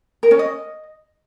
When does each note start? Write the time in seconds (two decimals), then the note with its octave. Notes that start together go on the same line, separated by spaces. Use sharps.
0.23 A#4
0.31 C#4
0.39 D#5